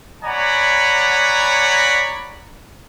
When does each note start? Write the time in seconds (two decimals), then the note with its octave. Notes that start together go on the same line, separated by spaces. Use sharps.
0.23 C#5 D5 F#5 G#5 A#5 B5